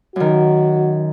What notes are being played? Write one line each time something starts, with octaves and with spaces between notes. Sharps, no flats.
F#2 D#3 F#4